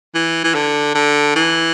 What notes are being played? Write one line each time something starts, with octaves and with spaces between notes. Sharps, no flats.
E3
E3
D3
D3
E3